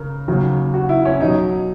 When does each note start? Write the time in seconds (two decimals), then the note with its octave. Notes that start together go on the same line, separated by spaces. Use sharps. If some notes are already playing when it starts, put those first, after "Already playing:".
Already playing: C#3 A#4
0.28 D#2 C#3 F#3
0.74 F#4
0.89 E4
1.05 C#4
1.20 B2 F#3 D#4